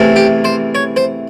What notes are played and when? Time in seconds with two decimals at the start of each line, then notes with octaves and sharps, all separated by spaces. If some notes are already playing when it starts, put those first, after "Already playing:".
Already playing: E2 C3 E3 A3
0.16 G4
0.44 C5
0.75 C#5
0.96 C5